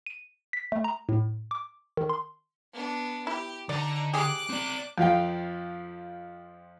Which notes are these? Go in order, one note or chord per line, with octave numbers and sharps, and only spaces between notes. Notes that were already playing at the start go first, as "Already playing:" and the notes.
D#7
B6
A3
A#5
A2
D6
D#3
C6
B3 D4
E4 G4
D3 D#4 D5 A#5
G4 G#4 D6 F#6
C4 D5
F2 F3 F5 G5